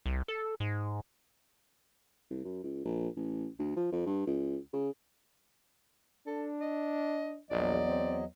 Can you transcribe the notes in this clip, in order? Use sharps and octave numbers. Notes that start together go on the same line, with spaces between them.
C2
A4
G#2
C2
F#2
C#2
A#1
A1
D2
F3
F2
G2
C#2
C#3
D4 A4
D#5
A#1 E2 F#3 D5 D#5
C4